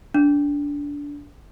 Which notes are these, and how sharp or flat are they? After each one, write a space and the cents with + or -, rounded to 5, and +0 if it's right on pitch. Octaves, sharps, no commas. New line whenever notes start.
D4 -20